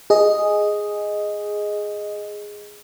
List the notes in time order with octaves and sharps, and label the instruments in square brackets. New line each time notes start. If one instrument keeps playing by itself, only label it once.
[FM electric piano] G#4 D#5